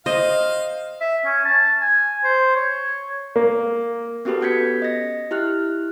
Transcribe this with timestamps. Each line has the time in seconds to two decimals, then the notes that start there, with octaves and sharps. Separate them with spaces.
0.06 C5 D#5 F5
1.01 E5
1.25 C#4
1.45 A5
1.81 G#5
2.24 C5
2.55 C#5
3.36 A#3
4.25 B3 C#4 F#4 G4 A4 B4
4.41 B3 C#4 G6 G#6 B6 C#7
4.82 D#5 A#6
5.31 E4 G4 F6 F#6